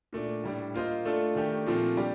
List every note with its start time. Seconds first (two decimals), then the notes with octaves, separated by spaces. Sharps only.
0.13 A#2 A3 D4
0.44 A2 G3 D4
0.74 A#3 F4 C5 D#5
1.05 A3 D4 F4 A4
1.35 D#3 A3 D4 G4 A#4
1.66 A#2 F3 A3 C4
1.97 G3 D4 G4